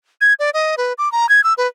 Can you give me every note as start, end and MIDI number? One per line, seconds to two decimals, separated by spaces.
0.21 0.34 92
0.39 0.50 74
0.54 0.75 75
0.78 0.93 71
0.98 1.11 86
1.12 1.29 82
1.29 1.44 92
1.44 1.54 88
1.58 1.67 71